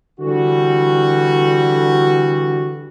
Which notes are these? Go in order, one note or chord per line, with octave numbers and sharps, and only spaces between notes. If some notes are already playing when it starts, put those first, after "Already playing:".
D3 E3 G3 F#4